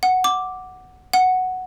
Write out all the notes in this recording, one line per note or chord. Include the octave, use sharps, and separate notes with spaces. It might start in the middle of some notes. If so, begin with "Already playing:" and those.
F#5
D6
F#5